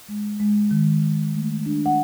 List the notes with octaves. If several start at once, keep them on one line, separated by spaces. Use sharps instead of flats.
G#3
G#3
D#3
D#3
A3
D4
F#5